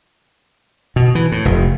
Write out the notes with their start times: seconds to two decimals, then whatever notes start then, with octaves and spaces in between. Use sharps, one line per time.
0.96 B2
1.15 E3
1.32 A2
1.45 F1